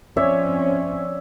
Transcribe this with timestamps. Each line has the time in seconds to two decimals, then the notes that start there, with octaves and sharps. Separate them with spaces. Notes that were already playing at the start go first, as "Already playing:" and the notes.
0.17 F3 C4 C#4 C#5 D5 E5